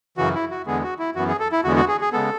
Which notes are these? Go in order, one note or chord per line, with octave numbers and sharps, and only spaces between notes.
F#2 C#3 E3 F#4
E4
F#4
E2 D3 G#3 B3 G#4
F#4
E4
F#2 E3 B3 F#4
G#4
A4
E4
E2 D3 G#3 B3 F#4
F#4
G#4
G#4
C#3 G#3 B3 A4